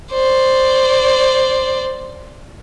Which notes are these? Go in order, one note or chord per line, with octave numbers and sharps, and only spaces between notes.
C5 D5